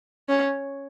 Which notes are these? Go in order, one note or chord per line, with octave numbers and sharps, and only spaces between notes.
C#4